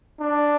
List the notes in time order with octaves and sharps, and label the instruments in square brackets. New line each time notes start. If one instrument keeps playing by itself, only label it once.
[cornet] D4